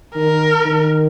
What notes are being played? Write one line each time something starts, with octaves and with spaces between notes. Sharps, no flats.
D#3 A#4
D#3